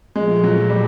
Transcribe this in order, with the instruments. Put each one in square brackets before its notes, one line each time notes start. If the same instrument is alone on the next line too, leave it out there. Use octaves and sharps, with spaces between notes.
[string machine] A#2 F3 A3 [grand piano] G#3
[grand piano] F#3
G3